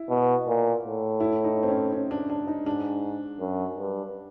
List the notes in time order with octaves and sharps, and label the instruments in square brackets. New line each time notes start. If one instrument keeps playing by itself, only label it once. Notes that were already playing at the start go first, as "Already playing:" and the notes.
Already playing: [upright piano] E4
[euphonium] B2
A#2
A2
[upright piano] E4
D#4
C4
C#4
C#4
D4
D4
D#4
[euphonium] G#2 [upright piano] D4
[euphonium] F#2
G2